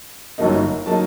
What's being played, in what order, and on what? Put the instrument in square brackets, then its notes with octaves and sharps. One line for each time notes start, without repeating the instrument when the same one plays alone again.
[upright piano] G1 F#2 F#3 A#3 D#4
F#3 A#3 D#4 A5